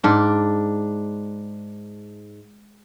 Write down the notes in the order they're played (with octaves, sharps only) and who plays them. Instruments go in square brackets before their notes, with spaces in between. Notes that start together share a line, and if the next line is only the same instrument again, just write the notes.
[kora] G#2 D4 D5